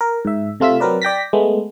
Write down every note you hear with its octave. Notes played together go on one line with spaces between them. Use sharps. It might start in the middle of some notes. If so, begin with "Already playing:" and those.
A#4
G#2 E5
C3 A3 F4 E6 B6
F#3 C4 A#4 B4 D5
D5 G5 A#6 B6
G#3 A3 B3